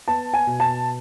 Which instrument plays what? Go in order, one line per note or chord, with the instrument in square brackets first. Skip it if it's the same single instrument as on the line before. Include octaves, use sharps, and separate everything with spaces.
[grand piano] B3 A5
G#5
B2
A5